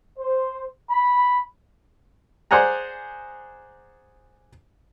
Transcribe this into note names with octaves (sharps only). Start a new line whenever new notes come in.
C5
B5
G#4 C5 D5 F#5 G#5 A#5